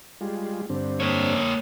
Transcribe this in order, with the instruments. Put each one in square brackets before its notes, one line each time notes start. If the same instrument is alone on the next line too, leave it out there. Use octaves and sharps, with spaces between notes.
[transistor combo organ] G3 G#3 F4
G2 D3 C4
[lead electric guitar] A#3 C#5